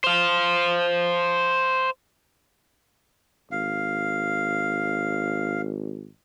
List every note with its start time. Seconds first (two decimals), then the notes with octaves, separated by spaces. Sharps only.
0.04 C5 F5
3.51 G#1 F5